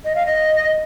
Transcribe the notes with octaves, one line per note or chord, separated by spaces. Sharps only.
D#5
F5
D#5